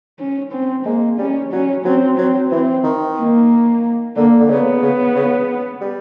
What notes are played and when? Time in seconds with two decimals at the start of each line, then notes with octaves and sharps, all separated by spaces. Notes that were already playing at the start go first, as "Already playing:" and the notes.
0.19 C#4
0.52 C4
0.85 G#3 A#3
1.18 G3 C#4
1.52 F#3 C#4
1.85 F#3 C4
2.18 F#3 C4
2.51 E3 C4
2.84 D#3
3.18 A#3
4.16 D3 A#3
4.40 D3
4.49 C#3 B3
4.82 C#3
5.15 C#3
5.81 G3